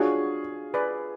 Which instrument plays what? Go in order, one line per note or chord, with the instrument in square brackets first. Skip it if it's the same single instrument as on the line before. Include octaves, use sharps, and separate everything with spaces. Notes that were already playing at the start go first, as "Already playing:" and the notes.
Already playing: [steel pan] D4 F#4 C#5 [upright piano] F4 G#4
[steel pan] G#4 B4 D5